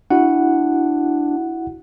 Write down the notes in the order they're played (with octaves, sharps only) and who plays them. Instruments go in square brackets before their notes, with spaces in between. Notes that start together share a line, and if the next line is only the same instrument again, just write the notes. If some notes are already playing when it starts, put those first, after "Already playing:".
[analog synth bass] D4 [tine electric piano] E4 F#4 F#5